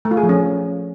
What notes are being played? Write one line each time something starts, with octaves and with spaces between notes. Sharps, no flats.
A3
F4
G#4
F3
C#4